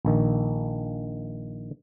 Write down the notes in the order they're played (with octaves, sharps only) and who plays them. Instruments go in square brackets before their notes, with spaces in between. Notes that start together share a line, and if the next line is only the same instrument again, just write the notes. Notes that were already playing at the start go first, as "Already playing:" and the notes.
[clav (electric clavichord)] A#1 D#3